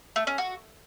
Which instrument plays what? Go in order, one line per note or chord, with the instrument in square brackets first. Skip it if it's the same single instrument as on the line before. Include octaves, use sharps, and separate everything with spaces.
[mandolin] A3
C#4
F#4